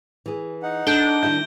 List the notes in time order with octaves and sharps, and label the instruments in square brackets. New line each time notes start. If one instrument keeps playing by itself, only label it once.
[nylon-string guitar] E3 G#4
[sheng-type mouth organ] D#4 F#5
[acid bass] D4 [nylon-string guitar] A4 [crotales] G6 D7 G7
[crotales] D7
[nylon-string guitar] D#3 G3 E4 [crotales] G6